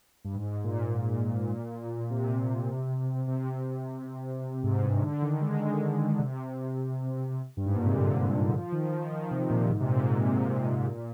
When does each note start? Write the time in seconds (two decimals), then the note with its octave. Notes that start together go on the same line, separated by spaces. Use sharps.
0.24 G2
0.35 G#2
0.64 A#2
2.10 C3
3.27 C3
4.63 G#2
4.83 G2
5.02 D3
5.22 D#3
5.41 G#3
5.60 G#3
6.19 C3
7.57 G2
7.66 G#2
7.75 A#2
7.86 C3
7.94 D3
8.53 F3
8.72 D#3
8.92 F3
9.12 D#3
9.31 C3
9.50 A#2
9.70 G#2
9.80 C3
9.85 A#2
9.99 G#2
10.13 A#2
10.28 C3
10.48 G#2
10.68 G#2
10.87 A#2